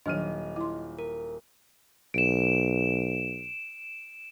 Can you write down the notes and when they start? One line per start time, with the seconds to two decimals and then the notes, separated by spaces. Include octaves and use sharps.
0.06 D#1 D#3 F#3 D4 D#5 F6 D#7
0.56 E4 C6
0.99 A#4
2.14 B1 D7 E7